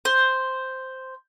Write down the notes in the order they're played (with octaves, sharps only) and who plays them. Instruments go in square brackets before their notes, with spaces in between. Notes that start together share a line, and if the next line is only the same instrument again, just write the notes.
[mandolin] C5